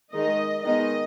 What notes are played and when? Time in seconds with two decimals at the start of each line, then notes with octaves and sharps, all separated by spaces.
0.13 D#3 G#3 D#4 D#5
0.63 D#3 G#3 B3 D#4 D#5